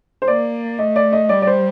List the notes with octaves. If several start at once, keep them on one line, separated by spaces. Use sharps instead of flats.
C5
A#3 D5
A3 D#5
D5
D#5
G3 D5
D5
C5